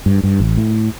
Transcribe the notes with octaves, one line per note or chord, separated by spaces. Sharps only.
G2
G2
A1
A2